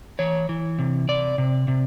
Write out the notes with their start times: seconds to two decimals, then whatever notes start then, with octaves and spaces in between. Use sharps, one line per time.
0.19 E3 C#5
0.49 E3
0.79 C3
1.08 C3 D5
1.38 C3
1.68 C3